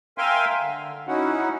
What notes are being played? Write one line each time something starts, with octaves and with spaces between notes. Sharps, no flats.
A#4 E5 F5 G5 G#5 C6
D3
C#4 D#4 E4 F#4 F#5